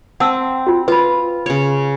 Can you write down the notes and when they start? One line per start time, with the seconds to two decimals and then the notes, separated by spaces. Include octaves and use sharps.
0.20 C4 F#5 A5 E6
0.67 F4 F#4
0.88 F4 B4 B5
1.46 C#3 C#5